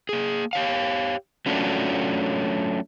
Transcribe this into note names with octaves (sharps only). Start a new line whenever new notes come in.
A#3 G#4
G4 C#5 F5
F#3 A3 C#4 D4 F4 F#4